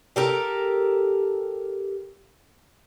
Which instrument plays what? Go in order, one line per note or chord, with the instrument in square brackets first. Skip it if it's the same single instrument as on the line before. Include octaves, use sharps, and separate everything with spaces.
[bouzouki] G4 A4 A#4